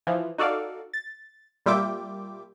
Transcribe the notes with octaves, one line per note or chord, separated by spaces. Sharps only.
E3 F3
D#4 F#4 A4 D5 F5
A6
A#2 G3 F4 E5 G5 D6